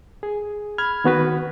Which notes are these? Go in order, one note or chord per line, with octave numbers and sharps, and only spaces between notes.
G#4
B5 F6 G#6
D#3 B3 F#4 B4